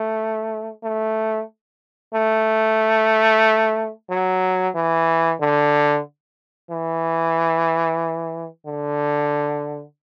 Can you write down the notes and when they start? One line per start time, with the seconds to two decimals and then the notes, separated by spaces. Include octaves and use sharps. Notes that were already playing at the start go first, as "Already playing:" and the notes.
Already playing: A3
0.83 A3
2.14 A3
4.10 F#3
4.75 E3
5.40 D3
6.70 E3
8.66 D3